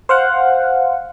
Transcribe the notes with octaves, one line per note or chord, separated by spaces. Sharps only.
C5 F5 F#5